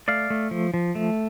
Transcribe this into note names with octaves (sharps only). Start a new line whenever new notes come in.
A3 D5 F5
A3
F3
F3
A3